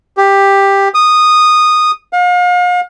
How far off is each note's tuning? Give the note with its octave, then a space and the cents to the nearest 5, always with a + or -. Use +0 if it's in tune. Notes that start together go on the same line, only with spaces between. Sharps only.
G4 +10
D#6 -10
F5 +40